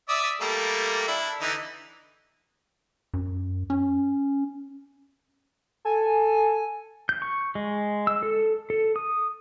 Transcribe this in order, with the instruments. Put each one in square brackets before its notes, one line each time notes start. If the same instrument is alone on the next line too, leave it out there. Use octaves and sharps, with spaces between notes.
[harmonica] D5 E5 D#6
G3 A3 A#3
D4 E4
D3 E3 D#4
[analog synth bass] F#2
C#4
[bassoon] A4 [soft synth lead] G#5
[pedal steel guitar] G6
C#6
G#3
E6
A4
A4
D#6